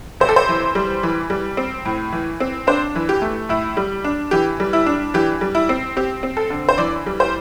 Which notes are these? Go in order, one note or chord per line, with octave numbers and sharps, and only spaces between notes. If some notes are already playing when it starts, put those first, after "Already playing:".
C3 C5
A4
C5
E3
G3
E3
G3
C4
A2
E3
C4
D4 C5
E3
G4
A3
A2 E4
G3
D4
E3 G4
G3
E4
D4
E3 G4
G3
E4
C4
C4 G4
C4
A4
D3
C5
E3 D5
G3
C5